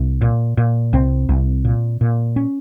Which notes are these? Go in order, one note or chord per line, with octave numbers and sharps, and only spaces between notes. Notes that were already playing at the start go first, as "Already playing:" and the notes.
Already playing: C2
A#2
A#2
C2 C4
C2
A#2
A#2
C#4